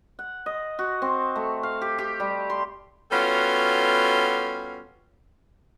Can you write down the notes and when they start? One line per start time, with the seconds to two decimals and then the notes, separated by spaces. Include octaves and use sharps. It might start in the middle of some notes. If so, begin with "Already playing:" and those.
0.19 F#5
0.46 D#5
0.79 F#4
1.02 C4
1.36 A3
1.63 F5
1.82 G4
1.99 G4
2.20 G3
2.50 C6
3.11 G3 B3 C#4 F4 F#4 A4